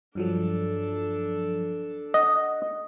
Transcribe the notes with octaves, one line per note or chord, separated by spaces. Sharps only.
G2 F3 F#3 D4 A4
D#5 F#5